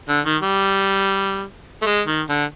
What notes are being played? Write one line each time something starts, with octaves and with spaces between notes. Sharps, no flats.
D3
D#3
G3
A3
G#3
D#3
D3